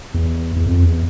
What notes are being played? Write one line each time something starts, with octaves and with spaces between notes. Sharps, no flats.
E2
E2
F2
E2